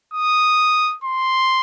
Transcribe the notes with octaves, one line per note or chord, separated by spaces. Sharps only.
D#6
C6